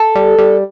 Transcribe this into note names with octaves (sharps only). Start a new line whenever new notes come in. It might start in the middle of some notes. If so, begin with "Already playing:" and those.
Already playing: A4
G3
G3